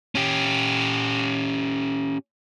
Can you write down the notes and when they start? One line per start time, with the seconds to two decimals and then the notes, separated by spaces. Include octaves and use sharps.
0.15 C#4 G4